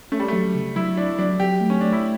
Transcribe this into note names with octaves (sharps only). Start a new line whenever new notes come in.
A3 C#4
G3
F#3 A3
C#3
F#3 E4
D4 E4
F#3 D4
F#3 G4
A3
C#4
A3 D4
E4